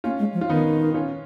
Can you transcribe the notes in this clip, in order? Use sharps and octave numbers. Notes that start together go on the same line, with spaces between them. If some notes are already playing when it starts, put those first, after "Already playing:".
A#3 C#4 F4
G#3
F3
F4
D#3 B3 D#4
C#4 F4